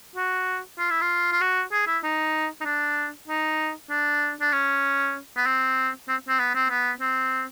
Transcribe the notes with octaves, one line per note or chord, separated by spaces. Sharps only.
F#4
F4
E4
F4
F4
F#4
G#4
E4
D#4
D#4
D4
D#4
D4
D4
C#4
B3
C4
C4
C4
B3
C4
B3
C4